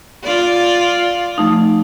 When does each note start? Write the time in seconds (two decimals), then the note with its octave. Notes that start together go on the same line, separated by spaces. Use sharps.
0.23 F4 D5
1.38 F3 A3 D#4